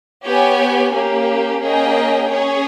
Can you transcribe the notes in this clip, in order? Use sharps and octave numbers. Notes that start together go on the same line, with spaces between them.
B3 G4 C#5 G#5
A#3 C#4 G4
A#3 C#4 G#4 D#5 G5
C#4 G#4 C#5